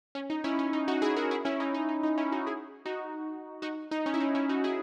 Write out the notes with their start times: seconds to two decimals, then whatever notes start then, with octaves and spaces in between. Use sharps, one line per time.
0.15 C#4
0.30 D#4
0.44 C#4 E4
0.59 C#4
0.73 D#4
0.88 D#4 F#4
1.02 E4 G#4
1.16 F#4 A#4
1.31 E4 G#4
1.45 C#4 E4
1.60 D#4
1.74 D#4
1.89 D#4
2.03 D#4
2.18 C#4 E4
2.32 D#4 F#4
2.47 E4 G#4
2.85 D#4 F#4
3.62 D#4 F#4
3.91 D#4
4.06 C#4
4.14 E4
4.20 D#4
4.35 C#4 E4
4.49 D#4 F#4
4.64 E4 G#4